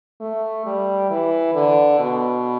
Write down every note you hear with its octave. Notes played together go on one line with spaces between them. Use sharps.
A3
G3
E3
D3
B2